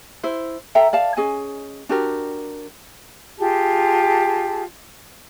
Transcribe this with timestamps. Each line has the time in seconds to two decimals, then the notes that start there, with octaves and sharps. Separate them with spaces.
0.24 E4 C5
0.75 A4 E5 G5 A#5
0.93 D5 F5 A5
1.17 C#4 G#4 D#5 G#5
1.89 D4 F#4 G4 A#4
3.38 F4 G4 G#4 A5